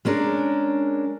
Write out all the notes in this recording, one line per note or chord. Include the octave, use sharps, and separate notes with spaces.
G#3 C#4 D4 A#4